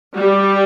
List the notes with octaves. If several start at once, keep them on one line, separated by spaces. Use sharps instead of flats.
G3